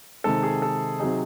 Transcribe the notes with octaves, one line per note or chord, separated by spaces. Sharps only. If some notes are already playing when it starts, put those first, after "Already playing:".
C3 D#3 G#3 A4
G#4
A4
C3 F#3 C4 D#4 G#4